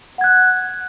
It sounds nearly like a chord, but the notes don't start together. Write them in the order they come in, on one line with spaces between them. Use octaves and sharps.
F#5 G#6 F#6